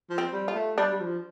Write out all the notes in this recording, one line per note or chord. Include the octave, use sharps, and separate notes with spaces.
F3
C4
G3
F4
A3
G3 D4
G3
F3